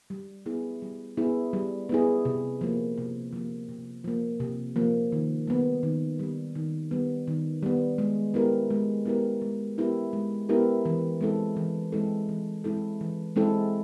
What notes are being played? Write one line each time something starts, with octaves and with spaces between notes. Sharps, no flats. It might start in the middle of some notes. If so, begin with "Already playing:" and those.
G3
B3 E4 G#4
G3
B3 E4 G#4
G3
B3 E4 G#4
C3
F3 A#3
C3
F3 A#3
C3
F3 A#3
C3
F3 A#3
D#3
G3 B3
D#3
G3 B3
D#3
G3 B3
D#3
G3 B3
G#3
B3 E4 G4 A#4
G#3
B3 E4 G4 A#4
G#3
B3 E4 G4 A#4
G#3
B3 E4 G4 A#4
E3
G#3 C4 E4 A4
E3
G#3 C4 E4 A4
E3
G#3 C4 E4 A4
E3
G#3 C4 E4 A4